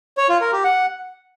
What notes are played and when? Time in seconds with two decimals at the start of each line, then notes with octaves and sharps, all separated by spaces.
0.17 C#5
0.29 F4
0.41 A#4
0.52 G4
0.64 F#5